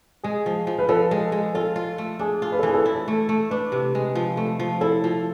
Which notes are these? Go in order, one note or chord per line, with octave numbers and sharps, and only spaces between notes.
G#3 G#4
F3
F3
B4
F3 A4
G#3
G#3
F4 A4
F4
A3
D4 G#4
F4
B4
A4
E3 G#4
A4
E4
A3
A3
D4 B4
C3
G#3
F3
A3
F3
E4 A4
F3